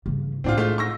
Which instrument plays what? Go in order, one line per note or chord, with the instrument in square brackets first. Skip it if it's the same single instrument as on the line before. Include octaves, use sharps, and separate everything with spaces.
[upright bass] G2 C#3
[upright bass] A2 E4 [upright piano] C4 D4 F4
[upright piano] G#3 A3 F4
C#6 E6 A#6